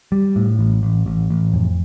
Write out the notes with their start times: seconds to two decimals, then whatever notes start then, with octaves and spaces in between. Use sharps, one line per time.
0.12 G3
0.36 A2
0.59 A1
0.83 A1
1.06 A1
1.30 A1
1.54 F2